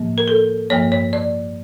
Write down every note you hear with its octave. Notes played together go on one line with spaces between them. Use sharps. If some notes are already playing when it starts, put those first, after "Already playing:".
Already playing: A2 F3 A#3
A#4
A4
G2 F3 A#3 C#5
C#5
D5